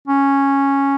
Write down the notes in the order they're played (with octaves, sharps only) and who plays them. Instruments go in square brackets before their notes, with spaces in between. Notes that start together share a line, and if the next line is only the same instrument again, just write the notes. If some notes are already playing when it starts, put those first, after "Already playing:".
[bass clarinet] C#4